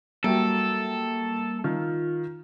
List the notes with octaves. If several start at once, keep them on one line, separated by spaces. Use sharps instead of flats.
F#3 G3 A#3 A4 E5 G5 D7
D#3 F4